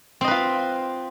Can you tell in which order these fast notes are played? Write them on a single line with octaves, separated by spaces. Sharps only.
C4 D#5 B4 F4